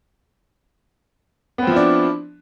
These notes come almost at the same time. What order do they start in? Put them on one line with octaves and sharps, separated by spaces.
B3 C4 F3 E4 D4